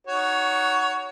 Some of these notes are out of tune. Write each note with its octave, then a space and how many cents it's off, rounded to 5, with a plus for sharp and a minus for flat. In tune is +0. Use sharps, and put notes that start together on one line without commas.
D#4 +0 F#4 +0 C#5 +20